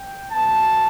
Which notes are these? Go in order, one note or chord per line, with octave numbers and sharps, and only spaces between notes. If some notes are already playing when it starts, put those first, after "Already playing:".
Already playing: G5
B2 F#3 B3 A5